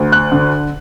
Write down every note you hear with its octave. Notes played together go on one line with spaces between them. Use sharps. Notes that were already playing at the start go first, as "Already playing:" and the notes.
Already playing: D2
F#6
D3